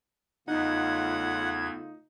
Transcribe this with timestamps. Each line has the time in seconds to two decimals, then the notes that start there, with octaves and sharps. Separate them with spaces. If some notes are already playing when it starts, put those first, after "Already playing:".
0.48 E2 C#3 A3 D#4 F4 F#5 G#6